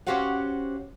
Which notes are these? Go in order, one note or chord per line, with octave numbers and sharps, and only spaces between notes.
C#4 F#4 G4 C5 F5 F#5